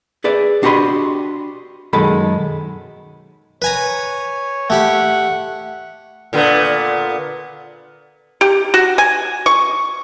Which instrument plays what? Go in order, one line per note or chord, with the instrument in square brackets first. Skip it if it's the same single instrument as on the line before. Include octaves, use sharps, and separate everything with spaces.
[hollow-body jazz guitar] G#4 B4 D5 E5
D4 F#4 G4 D#5 B5 C6
B1 F#2 D#3 G#3 A4 B5
[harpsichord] B4 G#5 A#5 [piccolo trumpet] C#5
[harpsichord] A3 G4 B5 [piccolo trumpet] F#5
[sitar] A#2 D3 B3
[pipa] G4
F#4
G#5
C#6